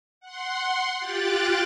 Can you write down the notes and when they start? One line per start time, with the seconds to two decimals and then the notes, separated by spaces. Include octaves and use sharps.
0.20 F#5 C6
0.98 F4 G4 G5 F#6 A6